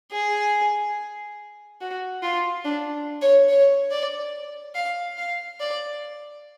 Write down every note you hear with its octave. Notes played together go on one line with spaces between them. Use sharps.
G#4
F#4
F4
D4
C#5
C#5
D5
F5
F5
D5